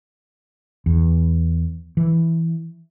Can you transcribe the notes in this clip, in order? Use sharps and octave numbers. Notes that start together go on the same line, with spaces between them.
E2
E3